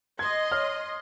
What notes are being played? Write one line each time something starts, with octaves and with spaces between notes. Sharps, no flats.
D#5 C6 G#6
C#5 F6